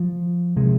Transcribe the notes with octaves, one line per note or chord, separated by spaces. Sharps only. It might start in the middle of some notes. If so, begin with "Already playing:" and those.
Already playing: F3
C3 G#3